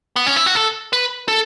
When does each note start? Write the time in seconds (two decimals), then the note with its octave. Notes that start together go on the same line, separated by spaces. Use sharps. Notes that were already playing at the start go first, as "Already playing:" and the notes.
0.16 B3
0.26 C#4
0.36 E4
0.46 F#4
0.55 A4
0.93 B4
1.28 A4